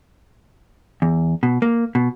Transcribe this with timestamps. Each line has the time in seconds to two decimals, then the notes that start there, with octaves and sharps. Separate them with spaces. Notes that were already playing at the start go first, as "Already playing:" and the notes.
1.02 E2
1.43 B2
1.62 A#3
1.95 B2